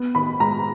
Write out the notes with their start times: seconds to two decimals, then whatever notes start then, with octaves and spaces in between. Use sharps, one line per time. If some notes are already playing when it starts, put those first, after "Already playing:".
Already playing: B3
0.15 D#3 B5
0.40 G#3 A#5